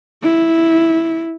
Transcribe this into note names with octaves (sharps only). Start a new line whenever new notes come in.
E4